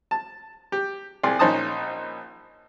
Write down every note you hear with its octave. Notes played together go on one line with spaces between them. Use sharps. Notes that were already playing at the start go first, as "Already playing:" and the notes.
A5
G4
C2 G#4 D5 C6
A#1 C#4 D#4 C5 A5 D#6